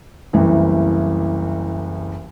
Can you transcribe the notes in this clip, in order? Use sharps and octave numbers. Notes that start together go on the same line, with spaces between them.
F#1 C2 E3